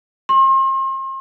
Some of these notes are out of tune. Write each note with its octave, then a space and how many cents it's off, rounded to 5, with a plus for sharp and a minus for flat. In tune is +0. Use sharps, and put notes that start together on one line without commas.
C6 +40